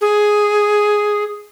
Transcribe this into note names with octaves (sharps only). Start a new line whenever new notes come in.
G#4